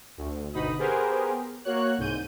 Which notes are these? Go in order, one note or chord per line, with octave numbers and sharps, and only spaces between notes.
D2
G1 D2 B2 D#4 B5 D#6
B3 G4 G#4 A#4 C5
A#3 F#4 C#5 F#6
C2 G#2 G6 D#7